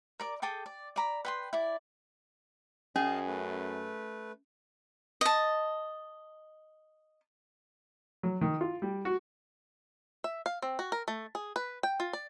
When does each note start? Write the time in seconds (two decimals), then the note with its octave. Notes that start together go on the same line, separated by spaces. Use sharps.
0.20 A#4 D5 D6
0.42 G#4 A4 G5 D6
0.66 D5
0.96 D5 A#5 B5
1.25 B4 G5 C6
1.53 E4 D5
2.96 F#2 C#4 G#4 D#5 F5 A5
3.27 A3 B4
5.21 D#5 A5
8.23 F#3
8.41 D#3
8.61 F4
8.82 G3
9.05 F#4
10.24 E5
10.46 F5
10.62 C4
10.79 F#4
10.92 A#4
11.08 A3
11.35 G#4
11.56 B4
11.83 G5
12.00 F4
12.13 D5